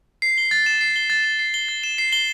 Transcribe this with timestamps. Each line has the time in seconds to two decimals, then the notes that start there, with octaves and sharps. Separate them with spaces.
0.22 C7
0.38 G7
0.51 A6
0.66 E7
0.81 C7
0.96 G7
1.10 A6
1.24 E7
1.39 C7
1.54 G7
1.69 A6
1.83 E7
1.98 C7
2.13 G7